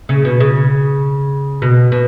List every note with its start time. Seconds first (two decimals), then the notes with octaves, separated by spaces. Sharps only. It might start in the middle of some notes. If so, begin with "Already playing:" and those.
0.09 C#3
0.25 B2
0.40 C#3
1.62 B2
1.92 B2